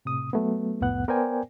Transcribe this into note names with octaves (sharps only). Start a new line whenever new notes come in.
A2 C3 D#6
F#3 A3 B3
C2 F2 A2 B3 F#5 F#6
B3 A#4 C5 D5 G5 G#5